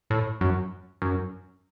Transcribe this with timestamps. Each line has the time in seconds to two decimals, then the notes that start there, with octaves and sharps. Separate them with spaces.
0.10 A2
0.41 F#2
1.02 F#2